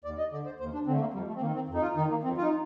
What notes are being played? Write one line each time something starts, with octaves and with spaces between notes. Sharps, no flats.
D#2 D5
D#5
D3 D5
C5
D#2 C5
D4
D3 C4
A3
A#3
F2 G3
A3
C4
D#3 A#3
C4
F2
D#4
F4
D#3 D#4
A#3
F2 C4
F4
D#4